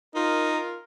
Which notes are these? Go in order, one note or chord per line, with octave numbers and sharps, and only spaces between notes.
D#4 F4 A#4